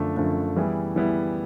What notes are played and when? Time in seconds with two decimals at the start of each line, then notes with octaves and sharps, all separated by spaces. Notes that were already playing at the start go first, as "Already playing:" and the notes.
Already playing: F#2 D3 F3 A3 D4
0.16 F#2 D3 F3 A3 D4
0.56 E3 G3 B3 E4 G#4
0.95 E3 G3 B3 E4 G#4